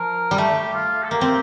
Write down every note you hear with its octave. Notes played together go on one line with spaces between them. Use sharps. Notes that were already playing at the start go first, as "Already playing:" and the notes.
Already playing: F3 A#4
G3
A3 G4
F4
A4
A#3 G4
C4